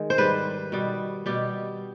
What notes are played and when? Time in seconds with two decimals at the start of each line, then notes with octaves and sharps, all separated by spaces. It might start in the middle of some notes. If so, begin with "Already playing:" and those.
Already playing: D#3 G#3
0.10 C5
0.18 G#2 G3 B4
0.72 B2 G3
1.26 B2 G3 G4